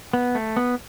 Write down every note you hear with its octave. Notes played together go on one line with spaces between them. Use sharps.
B3
A3
B3